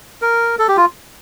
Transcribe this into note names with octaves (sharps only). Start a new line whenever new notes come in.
A#4
A4
G4
F4